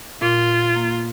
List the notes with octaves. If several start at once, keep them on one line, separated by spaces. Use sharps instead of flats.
A#2 F4
A#2
A#3